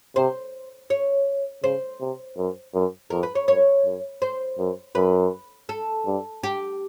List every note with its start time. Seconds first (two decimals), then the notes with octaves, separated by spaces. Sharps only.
0.16 C3 C5
0.90 C#5
1.63 C#3 C5
2.00 C3
2.37 F#2
2.74 F#2
3.10 F2 A#4
3.23 B4
3.35 C#5
3.48 F#2 C#5
3.85 F#2
4.22 C5
4.59 F#2
4.95 F#2 B4
5.69 A4
6.06 G2
6.43 G4